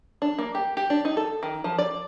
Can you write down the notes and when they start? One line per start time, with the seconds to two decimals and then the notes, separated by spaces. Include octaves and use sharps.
0.22 D4
0.38 A#3
0.55 G4
0.77 G4
0.90 D4
1.05 D#4
1.17 A4
1.43 D#3
1.64 F3
1.78 D5